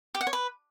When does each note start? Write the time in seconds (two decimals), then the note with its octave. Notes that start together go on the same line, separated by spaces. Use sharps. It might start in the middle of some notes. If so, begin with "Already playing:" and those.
0.15 G4
0.21 F#5
0.27 C#5
0.33 B4